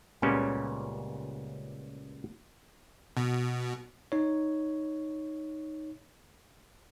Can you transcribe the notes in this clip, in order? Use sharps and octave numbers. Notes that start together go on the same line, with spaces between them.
C#2 A#2 C#3 G3 B3 C#4
B2
D#4 C#5